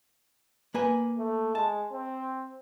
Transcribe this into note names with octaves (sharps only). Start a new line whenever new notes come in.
A#3 B4 G#5
A3
G#3 A5
C4